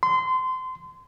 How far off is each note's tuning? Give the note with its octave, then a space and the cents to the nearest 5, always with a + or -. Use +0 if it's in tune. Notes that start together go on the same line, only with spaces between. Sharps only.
C6 -25